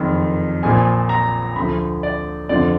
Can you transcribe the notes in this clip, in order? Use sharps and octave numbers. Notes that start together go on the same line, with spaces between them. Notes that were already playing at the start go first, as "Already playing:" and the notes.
Already playing: F#1 F2 D#3
A#1 A#2 F3 G#5
A#5
D2 D3 F3 B5
D5
F2 D3 F3 D5